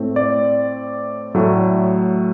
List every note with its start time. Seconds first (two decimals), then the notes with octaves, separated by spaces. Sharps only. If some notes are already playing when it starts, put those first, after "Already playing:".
Already playing: A2 A3 C4
0.16 D5
1.35 A2 F#3 A3